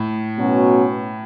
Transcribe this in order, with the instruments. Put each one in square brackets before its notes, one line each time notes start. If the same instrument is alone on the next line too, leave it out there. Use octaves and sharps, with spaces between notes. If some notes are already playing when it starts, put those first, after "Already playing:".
Already playing: [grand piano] A2
[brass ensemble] B2 F#3 C#4 F#4